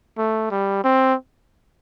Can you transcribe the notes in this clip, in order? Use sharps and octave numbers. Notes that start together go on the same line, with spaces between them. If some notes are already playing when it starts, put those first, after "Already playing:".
A3
G3
C4